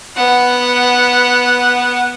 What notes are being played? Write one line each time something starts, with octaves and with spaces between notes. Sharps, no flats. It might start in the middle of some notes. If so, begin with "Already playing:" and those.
B3 F#5